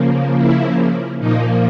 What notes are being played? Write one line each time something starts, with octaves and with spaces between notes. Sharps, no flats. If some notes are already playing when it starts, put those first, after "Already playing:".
Already playing: C#3 F3 A#3
E4
A#2 F3 A#3 D#4